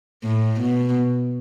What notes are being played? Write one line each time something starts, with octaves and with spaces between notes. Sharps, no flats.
A2
B2